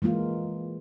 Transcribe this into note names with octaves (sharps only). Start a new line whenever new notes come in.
E3 G#3 A#3 F4